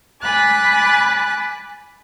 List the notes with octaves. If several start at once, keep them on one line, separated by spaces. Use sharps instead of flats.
G#5 B5 D6 F#6 A6